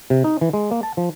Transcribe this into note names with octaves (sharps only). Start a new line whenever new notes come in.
C3
D#4
E3
G#3
A#3
A5
F3